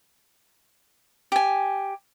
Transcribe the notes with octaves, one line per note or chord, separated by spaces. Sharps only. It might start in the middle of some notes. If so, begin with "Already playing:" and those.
G4 G#5